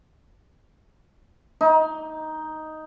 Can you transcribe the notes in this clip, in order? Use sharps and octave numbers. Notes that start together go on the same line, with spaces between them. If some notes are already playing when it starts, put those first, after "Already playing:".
D#4